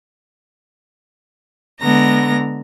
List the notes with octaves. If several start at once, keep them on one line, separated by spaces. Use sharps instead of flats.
D3 G#3 B3 A#5 A#6